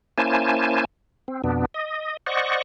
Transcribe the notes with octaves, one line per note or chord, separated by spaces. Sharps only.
A#3 C#4 E4 C5 G#5 A5
C4
F2 B2 B3 D4
D#5
C5 D5 D#5 F#5 C#6